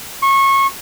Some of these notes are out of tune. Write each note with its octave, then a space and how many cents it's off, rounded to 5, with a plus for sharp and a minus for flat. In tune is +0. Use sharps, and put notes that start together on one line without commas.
C#6 -25